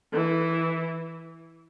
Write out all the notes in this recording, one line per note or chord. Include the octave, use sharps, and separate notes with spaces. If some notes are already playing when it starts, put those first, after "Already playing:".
E3